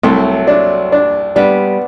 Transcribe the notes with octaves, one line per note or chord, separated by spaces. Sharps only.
C2 F#3 A3
D4
D4
G3 B3 D4